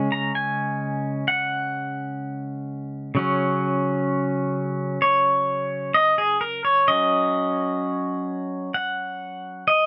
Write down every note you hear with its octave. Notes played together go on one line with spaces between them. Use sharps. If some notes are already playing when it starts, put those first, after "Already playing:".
Already playing: C#3 G#3 C#4
A#5
G#5
F#5
C#3 F#3 C#4
C#5
D#5
G#4
A#4
C#5
F#3 C#4 D#5
F#5
D#5